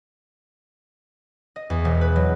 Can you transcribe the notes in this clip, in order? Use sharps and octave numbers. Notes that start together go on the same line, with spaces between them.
D#5
E2
E1
B4
F#3